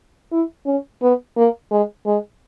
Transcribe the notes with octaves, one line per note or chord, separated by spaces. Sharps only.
E4
C#4
B3
A#3
G#3
G#3